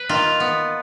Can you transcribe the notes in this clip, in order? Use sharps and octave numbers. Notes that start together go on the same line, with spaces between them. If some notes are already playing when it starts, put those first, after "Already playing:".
Already playing: B4
D#3 F4
B3